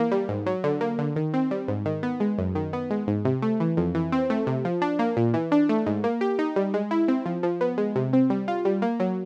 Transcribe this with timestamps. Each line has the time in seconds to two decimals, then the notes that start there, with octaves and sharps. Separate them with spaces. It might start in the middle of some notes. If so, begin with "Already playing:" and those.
Already playing: E3 A#3
0.12 G3
0.29 G#2
0.46 F#3
0.64 D3
0.81 A#3
0.99 D3
1.16 D#3
1.34 C4
1.51 G3
1.68 G#2
1.86 D#3
2.03 B3
2.20 G#3
2.38 F#2
2.55 D#3
2.73 B3
2.90 G#3
3.07 G#2
3.25 C3
3.42 A3
3.60 E3
3.77 F2
3.95 E3
4.12 C4
4.30 A3
4.47 C3
4.65 F3
4.82 D4
4.99 A#3
5.17 A#2
5.34 E3
5.52 D4
5.69 A3
5.86 G#2
6.04 A#3
6.21 G4
6.39 D#4
6.56 G3
6.74 G#3
6.91 E4
7.08 C4
7.26 F3
7.43 F3
7.61 B3
7.78 G#3
7.96 C3
8.13 C4
8.30 G3
8.48 F4
8.65 G3
8.82 A#3
9.00 F#3